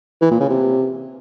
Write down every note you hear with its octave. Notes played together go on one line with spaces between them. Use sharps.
E3
A#2
C#3
C3